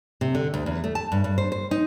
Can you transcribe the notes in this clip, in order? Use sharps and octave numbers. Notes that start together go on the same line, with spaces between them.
C3
D3
D2
E2
A3
A5
G2
G2
C5
C5
D#4